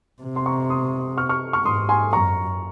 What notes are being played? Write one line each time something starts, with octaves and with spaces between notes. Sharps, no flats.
C3
C6
A#5 C#6
C6 D#6
C#6 F6
C#6 F6
C#6 F6
G#2 C6 D#6
G#5 C6
F#2 A#5 C#6